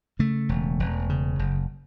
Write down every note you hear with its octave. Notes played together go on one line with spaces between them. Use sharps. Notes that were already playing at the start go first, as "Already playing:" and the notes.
C#3 A3
E1
E1
C#3
F#1